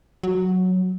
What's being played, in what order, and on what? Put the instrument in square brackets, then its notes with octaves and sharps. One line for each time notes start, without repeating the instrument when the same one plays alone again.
[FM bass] F#3